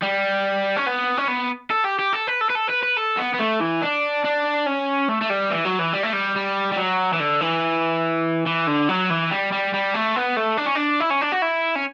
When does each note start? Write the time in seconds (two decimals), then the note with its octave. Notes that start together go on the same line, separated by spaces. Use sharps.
0.02 G3
0.76 C#4
0.86 B3
1.18 C#4
1.28 B3
1.71 A4
1.85 G4
1.99 G4
2.13 A4
2.27 B4
2.41 A4
2.50 B4
2.55 A4
2.69 B4
2.83 B4
2.97 A4
3.18 B3
3.34 B3
3.40 A3
3.60 E3
3.82 D4
4.24 D4
4.67 C#4
5.09 A3
5.21 A3
5.30 G3
5.51 E3
5.65 F#3
5.79 E3
5.93 G3
6.03 A3
6.13 G3
6.36 G3
6.72 G3
6.77 F#3
7.13 E3
7.20 D3
7.41 E3
8.47 E3
8.68 D3
8.89 F#3
9.10 E3
9.31 G3
9.52 G3
9.74 G3
9.94 A3
10.16 B3
10.37 A3
10.58 D4
10.66 C#4
10.75 D4
11.00 E4
11.11 C#4
11.21 D4
11.32 F#4
11.42 E4
11.76 C#4